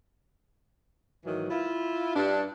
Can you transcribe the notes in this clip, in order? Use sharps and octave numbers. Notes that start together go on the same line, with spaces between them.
G#2 D#3 E3 F#3
E4 F4
G2 D4